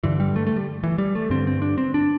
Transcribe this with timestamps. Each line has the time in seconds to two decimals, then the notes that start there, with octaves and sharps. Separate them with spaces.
0.04 G2 D3 E3
0.20 G3
0.36 A3
0.47 A3
0.56 G3
0.84 E3
0.98 G3
1.15 A3
1.30 G2 D3 C4
1.47 C4
1.62 D4
1.78 C4
1.94 D4